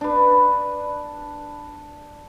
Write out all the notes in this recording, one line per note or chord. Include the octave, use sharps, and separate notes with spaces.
D4 B4